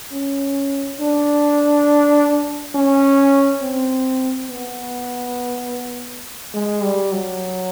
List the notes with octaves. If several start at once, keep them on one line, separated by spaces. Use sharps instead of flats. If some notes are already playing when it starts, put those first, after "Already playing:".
C#4
D4
C#4
C4
B3
G#3
G3
F#3